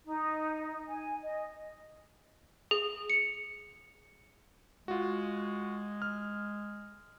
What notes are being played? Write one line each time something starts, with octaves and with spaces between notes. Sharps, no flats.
D#4
G#5
D#5
G#4
C#7
G#3 F4 F#4
F6